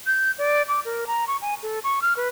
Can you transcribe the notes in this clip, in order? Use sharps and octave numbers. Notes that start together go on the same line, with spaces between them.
G6
D5
D6
A#4
A#5
C#6
G#5
A4
C#6
F6
B4